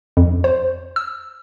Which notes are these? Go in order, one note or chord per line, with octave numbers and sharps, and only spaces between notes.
F2
C5
E6